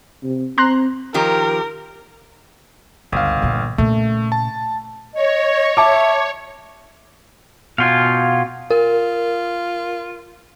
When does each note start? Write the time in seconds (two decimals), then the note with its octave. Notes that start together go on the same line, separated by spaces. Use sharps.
0.24 C3
0.58 C4 A#5 C6 F#6
1.14 D#3 F3 G4 A#4
3.12 G1 C#2 F5
3.42 E2 A#2
3.78 A#2 C#3 A3
4.32 A5
5.14 C#5 D#5
5.77 E5 A5 D6
7.78 B2 F4 F5 G5 G#5
8.71 F4 A#4